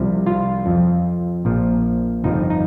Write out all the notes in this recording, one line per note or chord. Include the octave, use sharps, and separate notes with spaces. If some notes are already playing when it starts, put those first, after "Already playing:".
Already playing: C2 C3 F3
F4
F2 F3
A#1 A#2 F3
G1 F2 F3 D#4
D#4